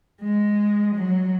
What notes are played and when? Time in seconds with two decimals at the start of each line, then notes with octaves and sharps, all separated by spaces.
0.21 G#3
0.95 F#3